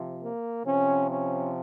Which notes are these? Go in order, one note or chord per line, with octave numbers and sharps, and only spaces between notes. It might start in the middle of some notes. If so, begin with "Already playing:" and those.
Already playing: C3 F3
A#3
C3 F3 C#4
C#4